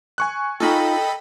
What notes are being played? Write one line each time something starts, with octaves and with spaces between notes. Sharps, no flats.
G#5 C#6 F#6
D#4 F4 A4 D#5 G5 B5